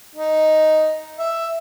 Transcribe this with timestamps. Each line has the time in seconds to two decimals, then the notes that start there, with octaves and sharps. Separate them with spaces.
0.15 D#4
1.19 E5